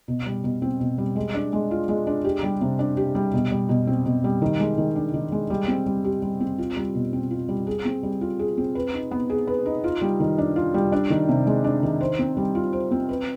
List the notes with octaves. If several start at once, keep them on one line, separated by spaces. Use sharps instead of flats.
B2
G3
B2
C4
B2
G3
G#3
D4
G#3
F4
G#3
D4
G4
G3
C3
D4
G4
G3
B2
G3
B2
C4
B2
G3
D#3
G#3
D#3
D4
D#3
G#3
G3
C4
G3
G4
G3
C4
F4
G3
B2
C4
F4
G3
G#4
C4
G3
F4
G#4
C4
B4
D#4
B3
G#4
B4
D#4
F4
G3
D#3
D4
F4
G3
D4
D#3
C3
G#3
D4
D#3
C5
C4
G3
F4
C5
C4
B4